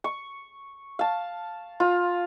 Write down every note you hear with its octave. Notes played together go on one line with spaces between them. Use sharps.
C#6
F5 A5
F4